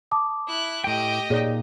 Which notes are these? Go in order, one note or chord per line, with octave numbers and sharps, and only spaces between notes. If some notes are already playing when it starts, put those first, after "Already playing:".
A5 D6 D#6
E4 F#6
A2 G4 D#5 G5
A#2 D#4 G#4 C#5 D5